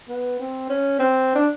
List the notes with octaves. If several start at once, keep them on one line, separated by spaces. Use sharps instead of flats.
B3
C4
C#4
C4
D4